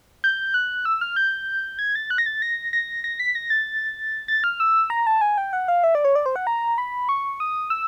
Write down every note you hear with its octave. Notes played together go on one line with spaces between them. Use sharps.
G6
F#6
E6
F6
G6
G#6
A6
F#6
A#6
A6
A#6
A#6
A#6
B6
A#6
A6
A6
F6
E6
A#5
A5
G#5
G5
F#5
F5
E5
D5
C#5
D5
C5
F#5
A#5
B5
C#6
D#6
E6